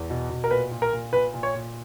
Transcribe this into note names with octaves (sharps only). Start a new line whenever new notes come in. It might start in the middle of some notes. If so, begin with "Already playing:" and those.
Already playing: E2
B2
B2
A#4
A#2 B4
A#2
A#4
A#2
A#2 B4
A#2
C#5
A#2